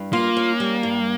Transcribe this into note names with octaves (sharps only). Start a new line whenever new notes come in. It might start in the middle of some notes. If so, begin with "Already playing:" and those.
Already playing: G2
A#3 F4
C#4
G3
G2